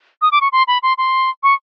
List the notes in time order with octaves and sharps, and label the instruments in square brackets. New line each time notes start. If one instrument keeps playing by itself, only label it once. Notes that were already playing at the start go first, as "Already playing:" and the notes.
[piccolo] D#6
D6
C#6
C6
B5
C6
C6
C#6